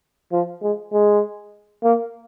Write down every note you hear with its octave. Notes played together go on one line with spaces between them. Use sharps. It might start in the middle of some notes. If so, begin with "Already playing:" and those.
F3
G#3
G#3
A#3